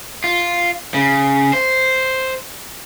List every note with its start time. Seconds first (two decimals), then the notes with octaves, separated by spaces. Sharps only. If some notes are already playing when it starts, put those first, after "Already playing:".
0.24 F4
0.94 C#3
1.53 C5